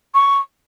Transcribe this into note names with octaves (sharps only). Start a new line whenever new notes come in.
C#6